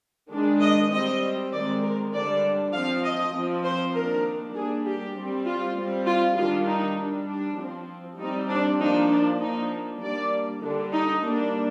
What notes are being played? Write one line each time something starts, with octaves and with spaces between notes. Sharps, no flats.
D#3 G#3 D4
D#5
G3 C4 D#5
D#3 G#3 C4 D5
A#4
D3 G3 D4 D5
F3 C4 F5
D#5
F3 C4
C5
D#3 A#3 D4 A#4
G3 A#3 D4 G#4
G4
G3 C4
F4
G3 C4
F4
D#3 G3 D4 F4
D#4
G3 D4
D4
F3 C4
G3 C4 D#4
D4
F3 A#3 D4 D#4
D4
F3 A#3 D4 D#4
G3 A#3 D4 D5
D3 G3 D4 D#4
D#4
G3 A#3 D4